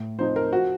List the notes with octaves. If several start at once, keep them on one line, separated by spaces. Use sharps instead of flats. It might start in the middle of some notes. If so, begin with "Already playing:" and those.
Already playing: A2
F3 C4 D#4 C5
A#4
F3 F#4